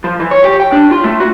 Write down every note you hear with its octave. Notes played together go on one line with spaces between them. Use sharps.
F3
E3
C#5
G4
G5
D4
F4
A3
F#4